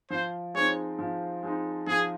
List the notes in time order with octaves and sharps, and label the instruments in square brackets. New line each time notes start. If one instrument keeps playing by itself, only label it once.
[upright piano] F3 [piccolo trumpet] C5
[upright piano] G#3 C4 D#4 [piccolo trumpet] C#5
[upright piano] F3
G#3 C4 D#4
[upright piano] F3 [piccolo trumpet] G#4